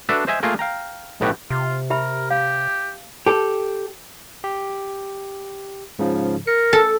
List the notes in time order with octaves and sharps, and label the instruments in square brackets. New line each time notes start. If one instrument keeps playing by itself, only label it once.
[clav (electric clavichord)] D4 F#4 A4 B4 D5 E5
C5 D#5 E5 G#5
A3 A#3 F4 G#4 A#4
F5 G5 A#5
B1 A2 B3 F#4 G4
[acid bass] C3 [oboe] F4
[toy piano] G4 E5 B5 [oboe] A#4
[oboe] G4 [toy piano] F5
[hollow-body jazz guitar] G4 A4
[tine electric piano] G4
G#2 C#3 F3
[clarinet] A#4 [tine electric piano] C#7
[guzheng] A4